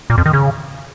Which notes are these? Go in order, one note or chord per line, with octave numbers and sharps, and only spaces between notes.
A#2
F2
D#3
C#3